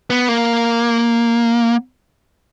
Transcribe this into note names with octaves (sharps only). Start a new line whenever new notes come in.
B3
A#3